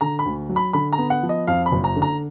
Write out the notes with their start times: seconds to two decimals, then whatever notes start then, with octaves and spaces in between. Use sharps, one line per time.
0.01 D3 A#5
0.19 B5
0.26 D2
0.49 F#3
0.56 B5
0.73 D3 B5
0.93 A#5
0.98 B3
1.10 F#5
1.23 F3
1.29 D#5
1.47 F2 F5
1.66 B5
1.72 F#1
1.84 A#5
1.96 D3
2.02 A#5